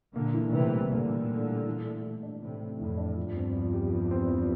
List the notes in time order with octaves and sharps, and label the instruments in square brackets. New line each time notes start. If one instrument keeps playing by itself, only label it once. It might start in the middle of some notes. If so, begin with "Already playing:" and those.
[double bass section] A#2 D3 [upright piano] A#3
[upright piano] E3
[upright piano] A2 [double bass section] C3 E3
[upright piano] G3
[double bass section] A#2 D3 [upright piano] A#3
[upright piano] E3
A2
G3
E3
A3
E3
D4
[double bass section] A2 C3 [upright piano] E3
[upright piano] A3
[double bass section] F2 A2 [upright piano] E3
[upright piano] D4
[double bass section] E2 G2 [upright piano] F3
[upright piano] C4
F3
G4
F3
C4
F3